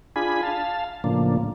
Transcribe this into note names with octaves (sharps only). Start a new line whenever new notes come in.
D4 F4 G#4 G#5 B5
F5 A5
A2 C#3 F3 A#3 D4